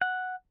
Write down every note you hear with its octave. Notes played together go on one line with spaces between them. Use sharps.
F#5